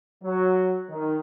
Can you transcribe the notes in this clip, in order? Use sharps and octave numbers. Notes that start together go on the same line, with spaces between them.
F#3
D#3